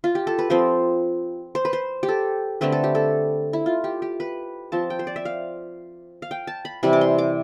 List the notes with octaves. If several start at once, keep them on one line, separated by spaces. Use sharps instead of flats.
F4
G4
A4
B4
F3 C4 C5
C5
B4
C5
G4
A4
D3 A3 C4 B4
A4
G4
A4
E4
F4
G4
G4
B4
F3 C4 A5
G5
C5
D5
E5
F5
F5
G5
A5
B5
C3 E3 G3 B5
D6
C6
D6